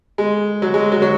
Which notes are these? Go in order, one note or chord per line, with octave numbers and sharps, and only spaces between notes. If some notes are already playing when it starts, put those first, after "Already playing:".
G#3
F#3
G#3
F#3
F#3